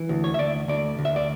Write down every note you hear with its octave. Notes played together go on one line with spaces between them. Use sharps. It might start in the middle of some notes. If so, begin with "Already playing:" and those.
Already playing: E3
D2
C#5
E5
D2 D5
D2 D5
D2
E5
D5